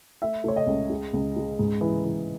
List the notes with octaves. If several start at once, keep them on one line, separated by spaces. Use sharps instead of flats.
A3 E5
A3 C#5
D#5
C#2
G#3
C#2
G#3
G#2
E3
E3